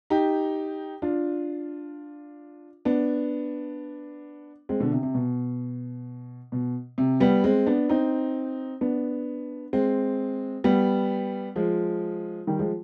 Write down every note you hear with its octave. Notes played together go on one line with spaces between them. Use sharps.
D#4 G4
D4 F4
B3 D4
G#3 C4
B2 D3
C3
C3
B2
B2
C3
G3 B3
G#3 C4
B3 D4
C4 D#4
B3 D4
G#3 C4
G3 B3
F3 G#3
D#3 G3
F3 G#3